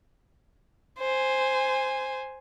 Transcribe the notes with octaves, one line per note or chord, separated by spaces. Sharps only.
C5 G#5